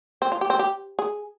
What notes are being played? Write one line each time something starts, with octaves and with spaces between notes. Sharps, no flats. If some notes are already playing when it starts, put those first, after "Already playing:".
C4
F4
G4
C4
G4
G#4